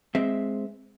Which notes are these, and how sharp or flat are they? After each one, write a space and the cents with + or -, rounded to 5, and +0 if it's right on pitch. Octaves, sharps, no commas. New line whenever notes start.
G#3 +0 C4 +0 E5 +0